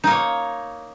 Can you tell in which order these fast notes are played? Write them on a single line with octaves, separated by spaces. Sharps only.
D#4 A#3 C#5